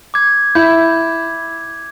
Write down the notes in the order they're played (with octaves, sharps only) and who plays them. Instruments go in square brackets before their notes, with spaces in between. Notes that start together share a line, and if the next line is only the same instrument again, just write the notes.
[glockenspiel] D6 G#6
[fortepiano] E4 [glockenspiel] G6